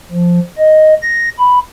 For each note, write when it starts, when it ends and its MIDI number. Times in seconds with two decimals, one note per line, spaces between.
0.11 0.39 53
0.58 0.94 75
1.02 1.29 94
1.39 1.59 83